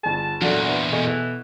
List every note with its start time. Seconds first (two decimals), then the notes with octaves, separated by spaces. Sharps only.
0.03 G1 G#4 A5
0.41 E2 A#2 F#3 D4 F#4 A4
0.64 D4 E4 B4
0.92 B2 G#3 A4 C#6
1.06 E3